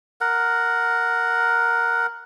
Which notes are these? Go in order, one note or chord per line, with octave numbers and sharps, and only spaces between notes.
A#4 F#5